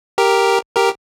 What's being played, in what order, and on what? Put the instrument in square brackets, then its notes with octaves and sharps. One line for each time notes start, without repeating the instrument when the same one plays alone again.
[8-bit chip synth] G4 A#4
G4 A#4